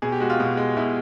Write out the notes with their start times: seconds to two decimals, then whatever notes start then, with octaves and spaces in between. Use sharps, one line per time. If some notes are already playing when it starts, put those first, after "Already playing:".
0.02 B2 G#4
0.12 G4
0.20 G#3 F#4
0.30 F4
0.40 B2
0.57 G#3
0.77 B2 E4